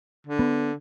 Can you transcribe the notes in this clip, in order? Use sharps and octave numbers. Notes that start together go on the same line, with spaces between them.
D3
B3